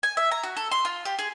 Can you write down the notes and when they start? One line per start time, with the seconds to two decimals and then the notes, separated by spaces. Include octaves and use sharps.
0.03 G#5
0.17 E5
0.31 A#5
0.43 F#4
0.57 A4
0.72 C6
0.85 F4
1.05 G4
1.19 G#4